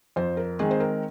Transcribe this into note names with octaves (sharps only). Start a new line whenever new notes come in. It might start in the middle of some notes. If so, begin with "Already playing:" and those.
F2 C5
A#4
D#3 G#3 C4 G#4
C5
A#4